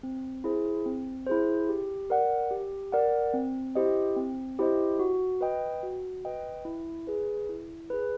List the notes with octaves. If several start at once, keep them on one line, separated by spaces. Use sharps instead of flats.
C4
E4 G#4 C5
C4
E4 G#4 C5
G4
A#4 D5 F#5
G4
A#4 D5 F#5
C4
E4 G4 C5 D#5
C4
E4 G4 C5 D#5
F#4
B4 D#5 G5
F#4
B4 D#5 G5
E4
G#4 B4
E4
G#4 B4